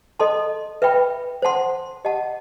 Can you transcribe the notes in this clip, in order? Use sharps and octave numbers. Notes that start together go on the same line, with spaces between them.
A4 D#5 A5 C6
B4 E5 G5 B5
C5 F#5 A5 C6
G4 D#5 F#5 A5